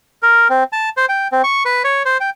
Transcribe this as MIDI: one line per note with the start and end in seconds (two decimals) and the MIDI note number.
0.23 0.48 70
0.50 0.64 60
0.73 0.89 81
0.97 1.06 72
1.09 1.28 79
1.32 1.42 60
1.44 1.63 85
1.65 1.83 71
1.84 2.03 73
2.05 2.17 72
2.20 2.30 79